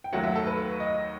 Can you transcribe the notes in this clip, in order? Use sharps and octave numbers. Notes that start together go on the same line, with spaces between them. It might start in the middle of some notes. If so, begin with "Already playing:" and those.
G5
D#2 D#3 F#3 A3 F#5
E5
A4
B4
D#5